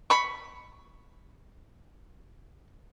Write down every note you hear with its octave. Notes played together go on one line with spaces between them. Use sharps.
B5 C#6